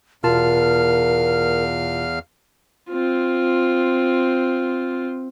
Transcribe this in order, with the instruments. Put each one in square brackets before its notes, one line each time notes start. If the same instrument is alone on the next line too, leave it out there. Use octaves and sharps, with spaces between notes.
[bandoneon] E2 F5 F6 [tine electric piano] B2 F4 A5 [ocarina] A#4
[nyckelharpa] C4 F4